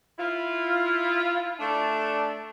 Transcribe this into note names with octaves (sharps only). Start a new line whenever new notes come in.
E4 F4
A3 D4